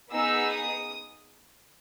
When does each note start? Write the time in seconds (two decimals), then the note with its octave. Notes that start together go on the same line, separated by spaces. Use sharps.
0.12 B3 D#4 G#4 E6
0.52 D#6